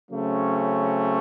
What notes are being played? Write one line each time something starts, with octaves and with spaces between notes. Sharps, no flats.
C#3 F#3 A3 C4 C#4